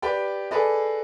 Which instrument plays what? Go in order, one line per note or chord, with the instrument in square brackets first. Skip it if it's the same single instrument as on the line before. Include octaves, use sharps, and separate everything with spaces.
[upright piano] G4 B4 D5 G5
G#4 A4 B4 D5 D#5